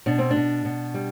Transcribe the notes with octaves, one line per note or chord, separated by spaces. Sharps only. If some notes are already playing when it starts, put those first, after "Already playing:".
B2 D4
C4
D4
B2
B2
G3